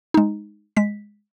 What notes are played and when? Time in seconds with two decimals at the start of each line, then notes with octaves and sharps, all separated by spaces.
0.14 G#3 D#4
0.77 G#3 B6